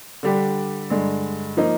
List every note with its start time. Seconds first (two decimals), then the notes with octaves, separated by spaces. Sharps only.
0.23 D3 G3 D4 G4
0.90 G2 D3 G#3
1.57 F3 A#3 D#4